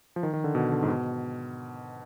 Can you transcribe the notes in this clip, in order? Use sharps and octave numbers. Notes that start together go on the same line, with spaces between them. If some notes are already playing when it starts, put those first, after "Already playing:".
F3
D#3
D#3
D3
B2
D3
G#2
B2